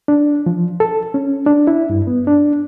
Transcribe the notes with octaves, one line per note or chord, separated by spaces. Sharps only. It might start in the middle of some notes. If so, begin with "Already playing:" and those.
D4
F3
A4
C#4
D4
E4
G2
B3
D4